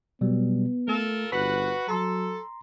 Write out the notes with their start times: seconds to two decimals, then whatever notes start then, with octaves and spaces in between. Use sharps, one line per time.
0.21 B2 F#3 G3 B3
0.88 A3 F4 A4 A#4
1.32 G1 F#4 B4 B5 B6
1.88 F#3 A4 A#5 C6